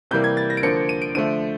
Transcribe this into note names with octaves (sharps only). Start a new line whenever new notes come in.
C3 E3 G3 A#3 G6
G#6
A6
A#6
D7
D3 F3 A#3 C#7
D#7
D7
D3 F3 A3 D#7